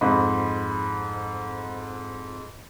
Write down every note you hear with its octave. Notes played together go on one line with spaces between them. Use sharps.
F2 G#2 D#5 B5